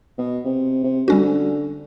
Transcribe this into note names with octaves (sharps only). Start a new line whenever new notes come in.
B2
C3
C3
D3 G3 C#4 F#4